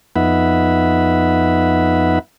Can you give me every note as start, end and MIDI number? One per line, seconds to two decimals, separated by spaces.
0.16 2.19 41
0.16 2.19 59
0.16 2.19 63
0.16 2.19 76
0.16 2.19 78
0.16 2.19 83